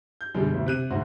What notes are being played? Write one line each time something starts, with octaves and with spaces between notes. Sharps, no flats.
G6
F#2 B2 D3 G3 G#3
F#1 D2 B2
C3 F#6 D#7
D2 G#2 F#4 C5